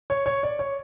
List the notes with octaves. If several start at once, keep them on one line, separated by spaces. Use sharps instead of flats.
C#5
C#5
D5
C#5